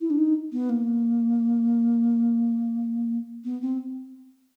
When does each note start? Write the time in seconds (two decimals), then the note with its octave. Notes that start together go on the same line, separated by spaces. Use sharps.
0.01 E4
0.10 D4
0.18 D#4
0.52 B3
0.69 A#3
3.44 B3
3.62 C4